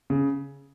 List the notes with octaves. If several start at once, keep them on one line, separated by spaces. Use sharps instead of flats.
C#3